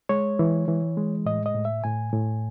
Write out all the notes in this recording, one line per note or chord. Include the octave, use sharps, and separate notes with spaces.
G#3 C#5
E3
E3
G#3
A2 D#5
D#5
A2
E5
A2 G#5
A2